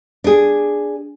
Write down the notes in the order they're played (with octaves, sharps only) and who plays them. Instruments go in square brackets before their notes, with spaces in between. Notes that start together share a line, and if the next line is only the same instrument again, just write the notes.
[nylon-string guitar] D4 G#4